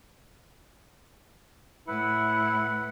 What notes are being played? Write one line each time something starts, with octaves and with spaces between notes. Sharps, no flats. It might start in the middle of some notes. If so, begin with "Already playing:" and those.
A2 E4 B4 F#5